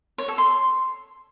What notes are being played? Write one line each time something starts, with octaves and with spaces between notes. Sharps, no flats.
C#5
A4
C6